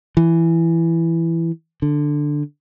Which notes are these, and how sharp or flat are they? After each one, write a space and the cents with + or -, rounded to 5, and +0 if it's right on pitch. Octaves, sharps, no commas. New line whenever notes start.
E3 +10
D3 +5